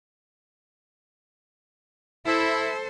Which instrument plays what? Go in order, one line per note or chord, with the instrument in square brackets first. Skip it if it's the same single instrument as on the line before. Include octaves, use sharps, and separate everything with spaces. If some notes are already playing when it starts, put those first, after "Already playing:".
[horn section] E4 [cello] A4 C5